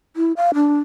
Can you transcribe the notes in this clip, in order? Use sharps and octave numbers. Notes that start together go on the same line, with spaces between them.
E4
F5
D4